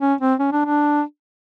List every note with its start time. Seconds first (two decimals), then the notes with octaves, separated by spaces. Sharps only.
0.01 C#4
0.21 C4
0.39 C#4
0.52 D4
0.66 D4